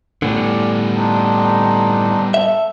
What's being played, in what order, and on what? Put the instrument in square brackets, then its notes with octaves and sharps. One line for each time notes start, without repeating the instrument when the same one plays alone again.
[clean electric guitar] A2 D3 [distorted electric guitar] G3 B3 [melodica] D5 G#5
[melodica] C4 D4 D#4
[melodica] A4 [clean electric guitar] E5